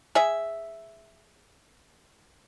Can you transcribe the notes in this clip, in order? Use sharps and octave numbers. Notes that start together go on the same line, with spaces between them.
G#4 E5